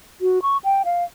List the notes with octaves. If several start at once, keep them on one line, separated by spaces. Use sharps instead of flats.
F#4
C#6
G5
F5